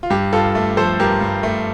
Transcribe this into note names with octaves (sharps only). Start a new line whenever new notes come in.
F4
G2 G4
G2 F4 A4
A3
F3 A4 C5
G2 G4 A#4
G2
A3